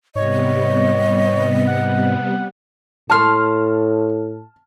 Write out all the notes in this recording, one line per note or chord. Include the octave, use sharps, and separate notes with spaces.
G#2 C3 G3 B3 C#5 D#5
F#5
A2 C#5 A5 C6 F6